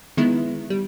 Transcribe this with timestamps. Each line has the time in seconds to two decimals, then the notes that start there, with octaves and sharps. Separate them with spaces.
0.17 D#3 G#3 B3 E4
0.70 G3